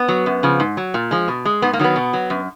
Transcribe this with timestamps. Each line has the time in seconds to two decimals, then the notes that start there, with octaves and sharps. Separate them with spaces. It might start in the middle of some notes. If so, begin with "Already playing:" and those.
Already playing: B3
0.08 F#3
0.26 F#2
0.43 C#3 F3
0.60 G#2
0.77 F#3
0.94 A#2
1.11 F3 G#3
1.28 B2
1.45 G#3
1.62 G#2 B3
1.73 A#3
1.79 D#3 F#3 B3
1.96 B2
2.13 F#3
2.30 F#2